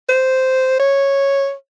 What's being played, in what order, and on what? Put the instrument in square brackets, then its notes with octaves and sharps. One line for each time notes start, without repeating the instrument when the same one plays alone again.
[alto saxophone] C5
C#5